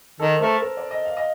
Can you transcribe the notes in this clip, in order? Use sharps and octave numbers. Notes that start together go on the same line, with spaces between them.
D#3 A4
C5
A3 A#4
A#4
D5
D#5
F5
D#5